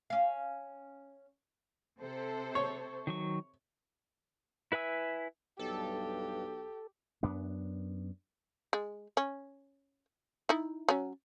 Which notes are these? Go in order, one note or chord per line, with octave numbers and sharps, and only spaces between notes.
C#4 F5
C3 A4 C5
C#5
D#3 F#3 C#6
E4 B4 E5 G#5 E6
B1 G2 G4 A4
F#2 B3 D4
G#3
C#4
D#4 E4
F#3 C#4